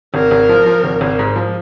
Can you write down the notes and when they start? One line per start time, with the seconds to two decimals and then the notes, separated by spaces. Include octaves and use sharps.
0.14 G#1 A#4
0.31 G#1
0.49 F3
0.66 F3
0.84 G#1
1.01 G#1
1.19 G#2
1.36 F3